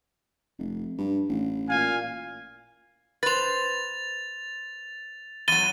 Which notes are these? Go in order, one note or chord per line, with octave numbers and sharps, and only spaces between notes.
F1
G2
A1
A#2 F5 G#5
B4 C5 A6 F7
E2 F#3 A6 D#7 G7